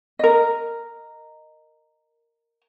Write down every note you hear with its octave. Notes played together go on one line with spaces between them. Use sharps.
A#4 D#5